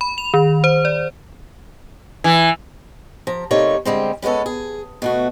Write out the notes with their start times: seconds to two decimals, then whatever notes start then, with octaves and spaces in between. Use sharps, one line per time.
0.01 B5
0.18 F7
0.34 D#3
0.64 C5
0.85 D5
2.24 E3
3.27 F3 A#5
3.51 C3 G3 A3 A#3 D#4 C#5
3.85 D3 G3 G#3 C4
4.22 G3 G#3 B3 C#4 A4
4.46 G#4
5.02 B2 A3 F#4